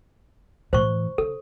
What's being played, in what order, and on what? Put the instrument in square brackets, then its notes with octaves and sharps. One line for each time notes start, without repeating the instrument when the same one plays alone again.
[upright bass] A2 E3 [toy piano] C5 C#6
[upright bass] C#3 [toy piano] A4